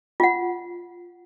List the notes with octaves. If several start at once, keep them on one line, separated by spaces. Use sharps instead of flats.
F4 F#5